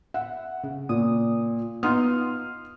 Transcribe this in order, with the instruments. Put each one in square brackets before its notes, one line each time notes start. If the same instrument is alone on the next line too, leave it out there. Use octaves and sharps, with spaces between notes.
[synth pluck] E5 [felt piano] F#5
[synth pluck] C#3
[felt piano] A#2 [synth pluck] D#6
[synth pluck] B3 D#4 F4 [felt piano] C6 D#6 F6